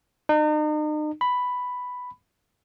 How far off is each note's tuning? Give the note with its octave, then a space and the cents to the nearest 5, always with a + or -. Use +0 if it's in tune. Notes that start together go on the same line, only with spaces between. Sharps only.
D#4 -40
B5 +5